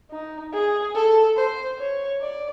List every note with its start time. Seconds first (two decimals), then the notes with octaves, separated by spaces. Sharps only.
0.11 D#4
0.53 G#4
0.95 A4
1.37 C5
1.79 C#5
2.21 D5